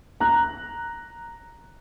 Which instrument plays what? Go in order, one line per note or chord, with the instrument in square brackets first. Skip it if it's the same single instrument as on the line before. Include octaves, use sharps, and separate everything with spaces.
[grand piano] A#5 F#6